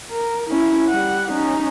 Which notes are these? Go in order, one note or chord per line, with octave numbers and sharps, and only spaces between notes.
A#4
C#4 E4
G3 F#5
C#4 D#4